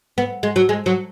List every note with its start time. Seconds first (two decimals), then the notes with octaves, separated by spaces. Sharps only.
0.18 B3
0.43 G#3
0.56 F#3
0.69 G#3
0.86 F#3